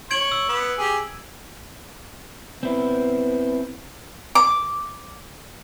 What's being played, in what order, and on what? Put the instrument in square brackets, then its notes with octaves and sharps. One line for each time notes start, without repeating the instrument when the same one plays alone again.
[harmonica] C#5 [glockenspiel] G#6 D7 F#7
[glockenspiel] E6
[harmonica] B3
G4 G#4
[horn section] B3 [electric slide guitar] C4 E4
[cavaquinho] D6